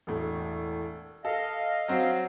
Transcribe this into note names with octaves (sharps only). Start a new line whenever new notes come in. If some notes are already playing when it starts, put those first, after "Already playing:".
E1 A2
A4 D#5 F5
F#3 C4 F#4